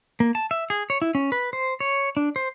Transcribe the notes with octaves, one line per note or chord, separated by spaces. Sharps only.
A#3
A5
E5
G#4
C#5
E4
C#4
B4
C5
C#5
D4
C5